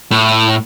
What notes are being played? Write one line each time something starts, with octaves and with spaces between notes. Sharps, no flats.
A2